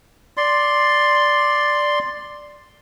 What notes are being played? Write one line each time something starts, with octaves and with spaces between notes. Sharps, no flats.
D5 C6